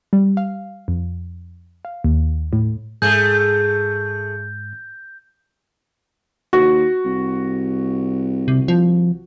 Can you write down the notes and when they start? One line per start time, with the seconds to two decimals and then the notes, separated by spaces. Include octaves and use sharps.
0.13 G3
0.37 F5
0.88 F2
1.85 F5
2.04 D#2
2.53 A2
3.02 G#2 A3 G#4 G6
6.53 D#2 F#4
7.05 C2
8.48 C3
8.68 F3